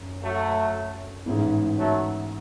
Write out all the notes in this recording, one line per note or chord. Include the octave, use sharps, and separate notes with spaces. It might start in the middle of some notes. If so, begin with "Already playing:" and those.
Already playing: F#2
F#3 A3
A1 G#2 G#3 B3 E4
F#3 A3